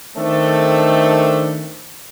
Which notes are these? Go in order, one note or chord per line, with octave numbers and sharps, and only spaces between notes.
D#3 A3 C4 D4 A4